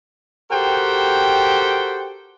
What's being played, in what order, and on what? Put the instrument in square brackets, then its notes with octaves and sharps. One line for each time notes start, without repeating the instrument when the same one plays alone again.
[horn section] F#4 G4 A4 A#4 C5 G5